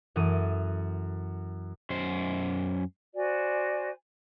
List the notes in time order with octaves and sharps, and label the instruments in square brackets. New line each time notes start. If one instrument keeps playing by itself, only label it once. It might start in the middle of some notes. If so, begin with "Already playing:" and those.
[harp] F#2 E3 A3 D#6
[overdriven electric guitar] F#2 C5
[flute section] F#4 C5 D5 G#5